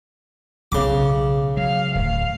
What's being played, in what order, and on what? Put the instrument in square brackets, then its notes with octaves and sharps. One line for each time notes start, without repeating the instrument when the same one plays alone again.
[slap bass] B1 [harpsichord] C#3 D6
[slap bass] F#3 [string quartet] F5
[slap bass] D1 A2 [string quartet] F5